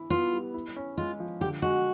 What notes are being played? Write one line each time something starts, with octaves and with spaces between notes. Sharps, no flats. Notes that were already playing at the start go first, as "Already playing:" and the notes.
Already playing: E3 E4
B3 F4
G3
E4
C#4
G#3 F4
F3
D3 G4
G#3 F#4